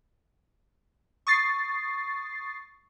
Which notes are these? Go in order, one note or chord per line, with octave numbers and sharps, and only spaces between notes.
C#6 D#6 A6 C7